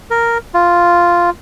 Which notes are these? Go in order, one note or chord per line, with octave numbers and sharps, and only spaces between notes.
A#4
F4